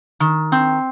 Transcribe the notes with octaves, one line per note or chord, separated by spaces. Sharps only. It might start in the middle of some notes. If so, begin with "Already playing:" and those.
D#3
C4